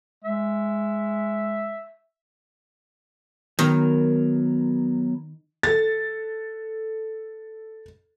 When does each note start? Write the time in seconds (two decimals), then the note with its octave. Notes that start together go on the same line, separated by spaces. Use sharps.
0.24 G#3 E5
3.59 D#3 F#3 B3 A#4
5.63 A4 A6